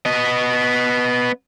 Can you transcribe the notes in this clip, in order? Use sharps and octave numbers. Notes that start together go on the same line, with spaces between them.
B3 D#5